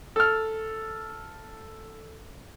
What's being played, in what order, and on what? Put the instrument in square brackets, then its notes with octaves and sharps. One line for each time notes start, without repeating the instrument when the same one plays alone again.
[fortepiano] A4 F6